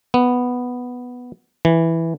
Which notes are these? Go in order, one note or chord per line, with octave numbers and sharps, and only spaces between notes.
B3
E3